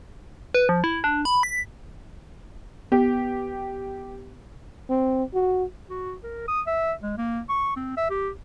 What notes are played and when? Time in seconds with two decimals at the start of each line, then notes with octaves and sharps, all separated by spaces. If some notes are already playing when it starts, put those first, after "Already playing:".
0.54 B4
0.69 F3
0.84 E4
1.04 D4
1.25 B5
1.43 B6
2.92 B3 G4
4.90 C4
5.34 F#4
5.90 F#4
6.23 A#4
6.48 D#6
6.67 E5
7.03 G#3
7.18 A#3
7.49 C#6
7.76 C4
7.97 E5
8.10 G4